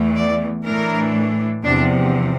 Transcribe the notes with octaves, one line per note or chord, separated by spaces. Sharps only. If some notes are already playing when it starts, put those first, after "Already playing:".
Already playing: E2 E3 A3
D5
A2 E3 A3 D4 A#4
E2 C3 F3 D4